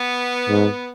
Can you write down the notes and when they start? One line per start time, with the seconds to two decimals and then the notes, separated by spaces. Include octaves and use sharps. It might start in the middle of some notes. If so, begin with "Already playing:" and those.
Already playing: B3
0.49 G#2